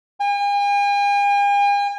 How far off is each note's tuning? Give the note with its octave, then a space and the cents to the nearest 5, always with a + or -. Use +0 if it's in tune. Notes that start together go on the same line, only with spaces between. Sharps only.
G#5 -45